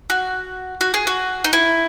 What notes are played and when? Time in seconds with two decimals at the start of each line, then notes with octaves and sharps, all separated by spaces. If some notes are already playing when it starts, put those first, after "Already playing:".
0.10 F#4
0.81 F#4
0.94 G#4
1.07 F#4
1.44 D#4
1.53 E4